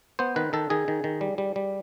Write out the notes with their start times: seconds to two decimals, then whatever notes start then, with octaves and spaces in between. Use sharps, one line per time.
0.19 B3 C5
0.36 D#3 B4
0.53 D#3 A4
0.70 D#3 G#4
0.88 D#3
1.04 D#3
1.21 G3
1.38 G3
1.56 G3